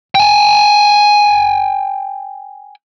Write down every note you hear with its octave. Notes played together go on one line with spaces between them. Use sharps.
G5 G#5